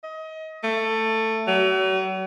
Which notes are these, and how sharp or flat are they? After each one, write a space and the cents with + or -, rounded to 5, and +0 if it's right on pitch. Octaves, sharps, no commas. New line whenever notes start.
D#5 +30
A3 +15
F#3 +40